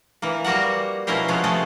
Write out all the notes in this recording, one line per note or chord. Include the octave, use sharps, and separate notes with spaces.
E3 A#3
G3 A#3 F#4 A#4 F#5
B2 F3 C#4 E4 A#4 C5
C3 F3 G#3 B3 C#4 C#5
G#3 A3 G#4 A4